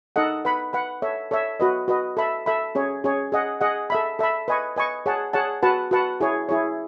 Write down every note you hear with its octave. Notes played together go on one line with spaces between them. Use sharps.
D#4 A4 D#5 F#5
B4 F#5 B5
B4 F#5 B5
A4 C#5 E5
A4 C#5 E5
F#4 B4 D#5
F#4 B4 D#5
A4 E5 B5
A4 E5 B5
C#4 G#4 C#5
C#4 G#4 C#5
G#4 D#5 F#5
G#4 D#5 F#5
A4 E5 B5
A4 E5 B5
B4 D#5 G#5 C#6
B4 D#5 G#5 C#6
G#4 C#5 F#5 A5
G#4 C#5 F#5 A5
F#4 B4 F#5 A5
F#4 B4 F#5 A5
E4 G#4 C#5
E4 G#4 C#5